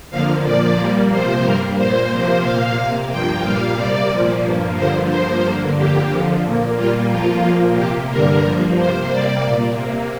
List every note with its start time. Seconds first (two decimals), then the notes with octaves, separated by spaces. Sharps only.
0.10 F2 D3 F3 A#3 F5
0.44 A#2 F3 A#3 D5
0.77 A#2 G3 A#3
1.11 C3 F3 A#3 C5
1.43 G2 G3 A#3 A#4
1.78 A#2 A#3 C5
2.10 C3 F3 A#3 C5
2.43 A#2 A#3 F5
2.76 C3 A#3 F5
3.10 G2 F3 A#3 G5
3.44 A#2 G3 A#3 F5
3.77 C3 G3 A#3 D5
4.11 A#2 F3 A#3
4.43 G2 F3 A#3
4.76 G2 D3 F3 A#3 C5
5.10 G2 F3 A#3 C5
5.44 G2 D3 A#3
5.77 F2 D3 A#3 G4
6.10 F2 D3 F3
6.43 A#2 A#3
6.76 A#2 G3 A#3 F4
7.10 F2 F3 A#3 F4
7.43 A#2 F3 A#3
7.76 C3 G4
7.81 A#3
8.10 G2 D3 G3 A#3 A#4
8.43 G2 F3 A#3
8.76 C3 A#3 C5
9.10 C3 G3 A#3 D5
9.43 A#2 A#3
9.76 C3 A#3